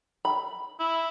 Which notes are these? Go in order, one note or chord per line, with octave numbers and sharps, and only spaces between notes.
B5
E4